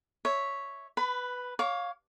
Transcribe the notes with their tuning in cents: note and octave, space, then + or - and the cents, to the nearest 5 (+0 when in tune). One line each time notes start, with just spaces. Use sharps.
C#5 +0 E5 -5
B4 +5 B5 +25
C#5 +0 F5 +15 D6 -30